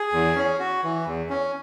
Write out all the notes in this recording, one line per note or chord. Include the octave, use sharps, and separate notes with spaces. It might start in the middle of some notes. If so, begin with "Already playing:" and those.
Already playing: G#4
E2
C#4
F#4
E3
E2
C#4